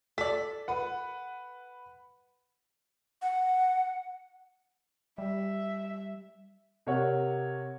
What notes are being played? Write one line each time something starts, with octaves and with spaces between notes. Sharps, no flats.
A4 D5 B6
B4 F#5
F#5
G3 E5
C3 A#4 C#5 F#5